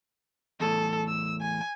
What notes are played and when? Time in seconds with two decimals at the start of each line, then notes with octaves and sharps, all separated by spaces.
0.60 E2 A2 A4
1.08 E6
1.41 G#5